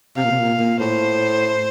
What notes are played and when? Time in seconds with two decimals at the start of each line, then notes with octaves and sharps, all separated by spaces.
0.17 C3 F5
0.24 A#2
0.31 C3
0.39 A#2
0.60 A#2
0.80 A2 C5